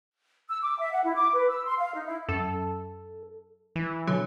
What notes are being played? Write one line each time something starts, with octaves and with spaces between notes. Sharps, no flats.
E6
D6
E5
F#5
E4
D6
B4
E6
C6
F5
D#4
E4
F#2 A4
E3
B2 D3 F#3